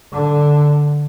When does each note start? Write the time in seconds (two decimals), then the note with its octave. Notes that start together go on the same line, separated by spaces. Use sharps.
0.13 D3